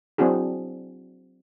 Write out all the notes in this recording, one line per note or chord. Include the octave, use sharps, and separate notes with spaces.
F#3 C4 D4 E4 F#4 G#4